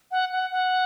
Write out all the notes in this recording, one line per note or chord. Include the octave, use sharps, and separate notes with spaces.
F#5
F#5
F#5